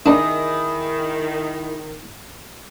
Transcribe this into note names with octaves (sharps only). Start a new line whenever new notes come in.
D#3 D4 E4 G#4 D#5